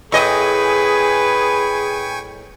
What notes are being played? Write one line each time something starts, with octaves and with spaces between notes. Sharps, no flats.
A2 G#4 B4 D#5 G5 G#5 C#6